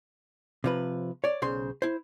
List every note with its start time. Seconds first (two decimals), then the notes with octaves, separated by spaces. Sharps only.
0.64 C3 F3 B4
1.24 C#5 D5
1.42 B1 C#3 C5 C6
1.82 E4 C5